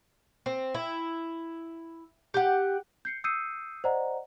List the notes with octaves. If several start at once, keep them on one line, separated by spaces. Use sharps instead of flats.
C4
E4
G4 F#5
G6 C7 C#7
D#6 E6 G6 C7 C#7 D#7
C5 D5 D#5 F#5 A#5